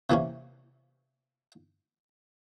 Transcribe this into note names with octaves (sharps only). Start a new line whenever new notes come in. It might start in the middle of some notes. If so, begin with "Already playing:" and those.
C3 E3 A#3 C#4